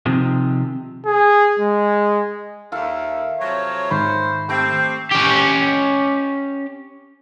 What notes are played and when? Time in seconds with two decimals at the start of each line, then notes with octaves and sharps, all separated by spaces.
0.06 C3 D#3 F3 G#3
1.06 G#4
1.59 G#3
2.72 D#2 A4 E5 F5
3.40 C3 F3 F#3 C#5
3.91 G#2 D#3 C5 B5 C#6
4.49 A3 C4 G4 G5
5.11 C#4 G4